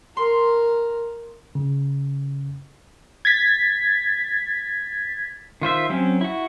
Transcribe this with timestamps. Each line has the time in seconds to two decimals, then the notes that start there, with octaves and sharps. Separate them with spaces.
0.17 A#4 C6
1.55 C#3
3.25 G#6 A6 B6
5.62 D#3 F4 C5 E5
5.90 F#3 C4 C#4
6.21 E4 F#4